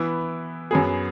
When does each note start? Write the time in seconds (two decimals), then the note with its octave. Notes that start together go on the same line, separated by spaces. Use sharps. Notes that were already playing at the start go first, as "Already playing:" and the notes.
Already playing: E3 B3 E4
0.71 F#2 F#3 B3 G#4